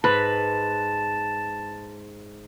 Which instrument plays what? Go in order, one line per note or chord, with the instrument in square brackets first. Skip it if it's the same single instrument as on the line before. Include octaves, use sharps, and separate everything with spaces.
[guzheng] G#2 [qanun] B4 [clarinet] A5